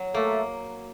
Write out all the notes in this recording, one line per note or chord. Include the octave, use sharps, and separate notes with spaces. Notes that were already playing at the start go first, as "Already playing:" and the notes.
Already playing: F#3
A3 A#3